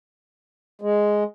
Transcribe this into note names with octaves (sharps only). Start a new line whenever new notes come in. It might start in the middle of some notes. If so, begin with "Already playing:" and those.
G#3